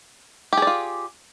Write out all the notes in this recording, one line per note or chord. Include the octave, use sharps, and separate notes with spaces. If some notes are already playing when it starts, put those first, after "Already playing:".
F4 G4 G#4 D5